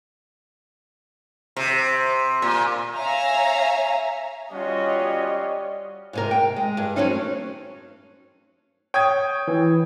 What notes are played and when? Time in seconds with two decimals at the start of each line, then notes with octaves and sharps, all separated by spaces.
1.57 C3
2.42 A#2
2.97 C#5 E5 F5 G#5 A#5
4.52 G3 C#4 F4 F#4 C#5 D#5
6.13 G#2 C3 A#4
6.31 G5
6.56 G#3
6.77 G2
6.96 F#3 G#3 A3 C4 C#4 D#4
8.94 C#5 G5 D#6 G#6
9.48 E3